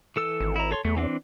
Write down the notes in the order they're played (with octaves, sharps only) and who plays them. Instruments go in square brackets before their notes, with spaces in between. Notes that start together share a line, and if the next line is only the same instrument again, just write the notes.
[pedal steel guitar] E3 A4 E6
[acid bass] G#1
[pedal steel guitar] E4 A#5
A4 C#5 C6
[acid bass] E2 [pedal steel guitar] A3
[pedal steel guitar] E3 C4 D4